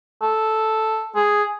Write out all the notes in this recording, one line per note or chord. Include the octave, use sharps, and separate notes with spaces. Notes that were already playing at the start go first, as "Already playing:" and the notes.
A4
G#4